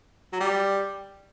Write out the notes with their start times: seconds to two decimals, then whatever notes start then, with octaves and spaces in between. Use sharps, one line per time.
0.33 F#3
0.40 G3